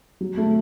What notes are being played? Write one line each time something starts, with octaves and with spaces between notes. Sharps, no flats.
F#3
A3